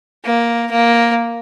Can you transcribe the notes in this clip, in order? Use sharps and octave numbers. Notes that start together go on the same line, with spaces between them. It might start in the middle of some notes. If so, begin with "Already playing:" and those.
A#3
A#3